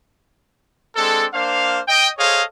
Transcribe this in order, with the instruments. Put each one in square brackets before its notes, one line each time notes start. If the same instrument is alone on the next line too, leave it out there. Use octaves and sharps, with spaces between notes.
[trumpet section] G#3 C4 D4 A4
A#3 D4 C5 F5
D#5 G5
G#4 A4 C5 C#5 D#5 F5